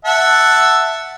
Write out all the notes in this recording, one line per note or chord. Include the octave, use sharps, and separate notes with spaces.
E5 F#5 A5